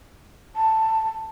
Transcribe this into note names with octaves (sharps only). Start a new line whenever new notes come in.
A5